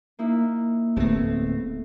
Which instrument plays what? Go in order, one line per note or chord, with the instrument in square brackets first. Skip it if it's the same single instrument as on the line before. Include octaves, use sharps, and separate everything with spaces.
[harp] A#3 D#4 E4
[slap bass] D1 B3 C4 [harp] A3